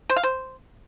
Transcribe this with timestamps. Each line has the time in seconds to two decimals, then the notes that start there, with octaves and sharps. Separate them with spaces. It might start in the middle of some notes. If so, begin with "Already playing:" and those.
0.10 C5
0.16 F5
0.23 C5